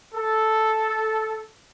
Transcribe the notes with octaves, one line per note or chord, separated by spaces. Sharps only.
A4